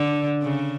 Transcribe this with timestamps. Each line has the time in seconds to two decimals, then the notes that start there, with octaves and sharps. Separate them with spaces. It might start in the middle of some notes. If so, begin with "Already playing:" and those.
Already playing: D3
0.43 C#3